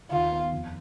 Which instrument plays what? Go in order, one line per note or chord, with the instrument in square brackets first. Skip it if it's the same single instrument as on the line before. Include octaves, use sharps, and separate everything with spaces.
[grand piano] D#2 [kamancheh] F4
[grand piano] B3
F2